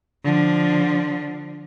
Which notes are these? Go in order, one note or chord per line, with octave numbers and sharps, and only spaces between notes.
D3 F3